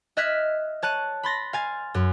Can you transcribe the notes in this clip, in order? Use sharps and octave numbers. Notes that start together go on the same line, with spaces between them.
D#5 E5 F6 F#6 G#6 B6
C#5 A5 F#6 D#7
B5 C6 A6 A#6
F5 G#5 A6
F#2